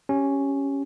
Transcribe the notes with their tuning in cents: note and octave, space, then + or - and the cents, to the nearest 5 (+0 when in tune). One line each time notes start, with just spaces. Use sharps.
C#4 +0 G4 +0